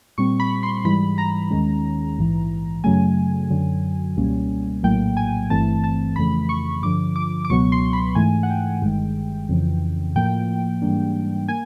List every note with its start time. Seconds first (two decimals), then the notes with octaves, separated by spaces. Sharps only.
0.18 A#2 G3 C4 C#6
0.40 B5
0.63 C6
0.84 G#2 E3 G3 B5
1.18 A#5
1.51 D#2 D#3 G#3 C#4
2.18 A#1 G#2 E3
2.84 F#2 C#3 F#3 A3 G#5
3.50 F#2 D3 F#3
4.17 C#2 B2 G3 A#3 C#4
4.83 A#1 A2 F#3 A#3 G5
5.17 G#5
5.50 G1 G2 E3 A3 C4 A5
5.84 A5
6.16 F2 C#3 E3 A3 B5
6.49 C#6
6.82 G2 D3 F3 D6
7.16 D6
7.45 D6
7.50 C#2 B2 F#3 B3 C#6
7.72 C6
7.93 B5
8.15 G#2 E3 A3 G#5
8.43 F#5
8.50 G5
8.82 G1 G2 D#3 G#3
9.49 F2 C#3 E3
10.15 A2 F3 A#3 G5
10.82 G#2 E3 G3 A#3 D4
11.48 A#3 G#5